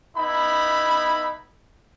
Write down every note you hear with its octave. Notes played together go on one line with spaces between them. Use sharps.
B3 D#4 E4 B5